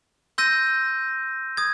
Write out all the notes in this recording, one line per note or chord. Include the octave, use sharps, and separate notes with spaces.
C6 E6 G6 A#6 D#7
D#6 G#6